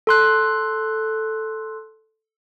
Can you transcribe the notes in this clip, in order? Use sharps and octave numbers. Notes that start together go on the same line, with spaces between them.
A4 C6 F#6